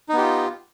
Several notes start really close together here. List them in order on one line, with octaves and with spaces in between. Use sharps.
D#4 B3 G4 F4